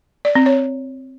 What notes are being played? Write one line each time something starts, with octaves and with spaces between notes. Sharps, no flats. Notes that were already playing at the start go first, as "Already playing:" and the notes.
D5
C4
C#5